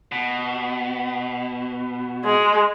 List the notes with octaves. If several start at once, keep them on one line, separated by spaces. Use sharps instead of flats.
B2
G#3